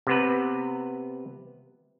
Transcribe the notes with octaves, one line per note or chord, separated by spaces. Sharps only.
C3 B3 B4